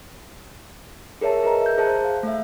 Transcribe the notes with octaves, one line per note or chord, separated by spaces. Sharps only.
G#4 A#4 C#5 E5 A5
G#4 A#4 B4 D#5 A#5
E5 G6
G#4 C5 A5
F5
A3 E5